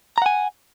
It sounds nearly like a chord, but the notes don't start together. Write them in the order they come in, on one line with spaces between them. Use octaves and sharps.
A#5 F#5 G#5